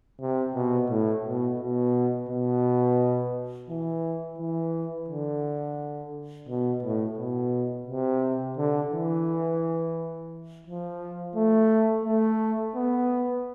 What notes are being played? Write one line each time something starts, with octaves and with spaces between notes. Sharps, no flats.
C3
B2
A2
B2
B2
B2
E3
E3
D3
B2
A2
B2
C3
D3
E3
F3
A3
A3
B3